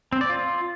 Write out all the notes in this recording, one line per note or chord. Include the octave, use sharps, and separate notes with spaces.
C4
D5
F4